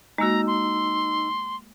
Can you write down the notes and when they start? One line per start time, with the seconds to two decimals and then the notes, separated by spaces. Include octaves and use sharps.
0.18 G#3 A#3 D#4 F#4 A#5 E6
0.47 C6